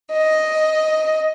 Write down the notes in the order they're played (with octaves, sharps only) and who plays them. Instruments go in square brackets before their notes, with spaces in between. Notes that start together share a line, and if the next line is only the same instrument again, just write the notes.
[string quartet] D#5